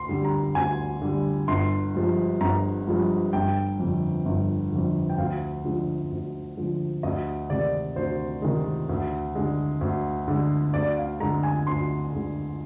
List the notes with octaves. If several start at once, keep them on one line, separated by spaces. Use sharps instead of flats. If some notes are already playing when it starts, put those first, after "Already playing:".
Already playing: D2 C6
D3 G3
A#5
D2 G#5
D3 G3
G1 C6
G2 F3 G#3
G1 A#5
G2 F3 G#3
G1 G5
F2 D3
G1
F2 D3
G5
D2 F5
D3 F3 G#3
D2
D3 F3 G#3
D2 D#5
C3 D#3 G#3 D5
D2 C5
C3 D#3 G#3
D2
D3 G#3
D2
D3 G#3
D2 D5
F5
D3 G#3 A#5
G#5
D2 C6
D3 G#3